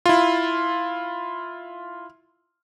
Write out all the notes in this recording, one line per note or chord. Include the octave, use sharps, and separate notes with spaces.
E4 F4